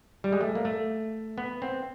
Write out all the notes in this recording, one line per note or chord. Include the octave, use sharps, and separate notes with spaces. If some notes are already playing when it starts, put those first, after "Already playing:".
G3
G#3
A3
A#3
A3
B3
C4